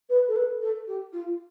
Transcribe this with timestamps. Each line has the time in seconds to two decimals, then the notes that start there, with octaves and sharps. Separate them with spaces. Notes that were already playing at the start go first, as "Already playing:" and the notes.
0.09 B4
0.28 A4
0.36 B4
0.61 A4
0.87 G4
1.13 F4